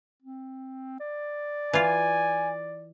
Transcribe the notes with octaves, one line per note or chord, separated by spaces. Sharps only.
C4
D5
E3 F4 G#5